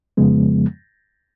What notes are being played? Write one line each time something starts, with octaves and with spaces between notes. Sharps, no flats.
F2 C#3 F3 G#3 B3